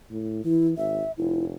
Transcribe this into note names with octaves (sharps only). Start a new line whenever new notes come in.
A2
E3 E4
G#1 E5
F1 E4